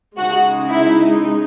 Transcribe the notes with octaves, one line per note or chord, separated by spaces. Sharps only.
C#3 G#3 D#4 F#4 F#5
E4 E5